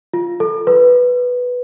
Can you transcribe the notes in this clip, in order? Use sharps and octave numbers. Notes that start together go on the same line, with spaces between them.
F4
A4
B4